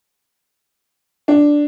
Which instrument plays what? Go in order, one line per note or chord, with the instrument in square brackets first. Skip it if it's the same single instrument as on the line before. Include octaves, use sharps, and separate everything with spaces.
[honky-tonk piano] D4